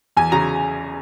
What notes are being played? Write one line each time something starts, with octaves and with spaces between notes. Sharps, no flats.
E2 G#5
C#3 A#5